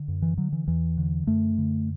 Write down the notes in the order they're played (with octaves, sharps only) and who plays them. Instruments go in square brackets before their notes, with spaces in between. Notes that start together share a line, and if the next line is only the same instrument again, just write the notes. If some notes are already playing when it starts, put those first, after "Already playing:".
Already playing: [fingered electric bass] D3
F#2
E3
D3 F#3
E3
E2 E3
D3
F#2 A3
D3